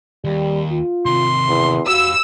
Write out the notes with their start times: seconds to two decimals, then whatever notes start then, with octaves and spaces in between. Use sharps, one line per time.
0.25 D#2 G3
0.71 F4
1.06 C3 D#3 C6
1.48 E2
1.88 F#4 G4 F5 E6